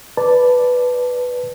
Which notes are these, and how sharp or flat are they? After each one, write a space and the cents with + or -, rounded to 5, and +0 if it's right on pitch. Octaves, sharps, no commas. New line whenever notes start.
B4 +0 D5 +0 A5 +0